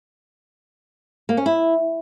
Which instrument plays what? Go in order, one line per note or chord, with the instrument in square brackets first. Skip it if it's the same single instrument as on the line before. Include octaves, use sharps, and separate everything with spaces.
[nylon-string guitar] A#3
C#4
E4